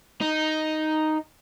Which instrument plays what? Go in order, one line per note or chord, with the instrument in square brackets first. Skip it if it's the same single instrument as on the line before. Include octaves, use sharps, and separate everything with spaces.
[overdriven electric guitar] D#4